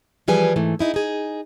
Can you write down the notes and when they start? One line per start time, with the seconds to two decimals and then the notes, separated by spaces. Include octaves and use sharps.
0.28 E3 F3 G3 G#4 B4 G#5
0.56 G#2 E3 A3
0.79 D#4 E4 G#4
0.94 D#4 G#4